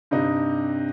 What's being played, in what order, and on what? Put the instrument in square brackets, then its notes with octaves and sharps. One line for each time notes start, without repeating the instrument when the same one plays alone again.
[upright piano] G2 C3 D#4